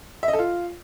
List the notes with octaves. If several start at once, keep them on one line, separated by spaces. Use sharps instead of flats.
E5
D#5
A4
F4